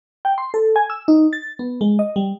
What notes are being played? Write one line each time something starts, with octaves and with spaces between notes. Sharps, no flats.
G5
C6
A4
G#5
E6
D#4
A6
B3
G#3
D#5
G3